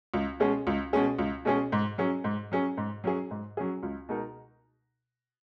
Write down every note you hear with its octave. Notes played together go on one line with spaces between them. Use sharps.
C#2
B2 G#3 C#4 G#4
C#2
B2 G#3 C#4 G#4
C#2
B2 G#3 C#4 G#4
G#2
F#3 C#4 G#4
G#2
F#3 C#4 G#4
G#2
F#3 C#4 G#4
G#2
F#3 C#4 G#4
C#2
B2 G#3 D#4 A#4